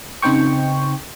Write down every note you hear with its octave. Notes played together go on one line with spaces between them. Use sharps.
C#3 C4 D#4 C5 G5 C#6